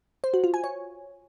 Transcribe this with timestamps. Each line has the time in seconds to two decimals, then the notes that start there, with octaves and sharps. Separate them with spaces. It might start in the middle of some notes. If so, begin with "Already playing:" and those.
0.24 C5
0.34 F#4
0.44 F4
0.54 G#5
0.64 C#5